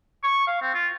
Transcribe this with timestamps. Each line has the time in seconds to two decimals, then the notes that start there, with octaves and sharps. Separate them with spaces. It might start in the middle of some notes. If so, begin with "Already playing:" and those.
0.24 C#6
0.48 F5
0.62 C4
0.74 F4